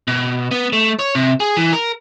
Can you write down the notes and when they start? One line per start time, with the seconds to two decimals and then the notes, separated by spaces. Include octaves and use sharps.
0.08 B2
0.51 B3
0.73 A3
0.99 C#5
1.15 C3
1.40 G#4
1.57 E3
1.73 A#4